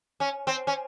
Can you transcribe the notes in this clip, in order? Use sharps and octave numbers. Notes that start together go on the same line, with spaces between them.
C#4
C4
C#4